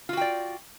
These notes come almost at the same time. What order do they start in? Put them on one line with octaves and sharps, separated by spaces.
F4 F#4 G5 D5